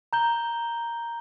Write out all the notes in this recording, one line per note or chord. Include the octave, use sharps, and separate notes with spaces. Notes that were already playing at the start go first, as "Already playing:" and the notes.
A#5 G6 G7